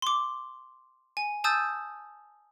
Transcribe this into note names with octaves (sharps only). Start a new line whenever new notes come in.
C6 D6
G#5
G#5 A5 D#6 E6 G6 A6